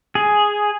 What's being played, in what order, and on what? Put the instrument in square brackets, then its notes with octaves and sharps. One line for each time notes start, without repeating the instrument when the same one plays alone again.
[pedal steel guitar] G#4